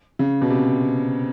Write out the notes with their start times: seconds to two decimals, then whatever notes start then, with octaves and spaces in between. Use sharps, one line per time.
0.19 C#3
0.42 B2
0.50 C3